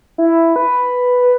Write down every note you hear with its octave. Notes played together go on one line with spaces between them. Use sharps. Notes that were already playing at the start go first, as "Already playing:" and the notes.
E4
B4